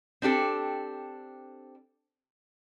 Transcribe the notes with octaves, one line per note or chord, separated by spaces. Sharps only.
C4 D4 G4 A4